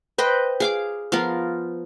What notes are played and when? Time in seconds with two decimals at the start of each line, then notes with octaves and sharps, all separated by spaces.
0.18 B4 C5 D#5 G5
0.60 G#4 F5 D6
1.12 F3 B3 F4 A#4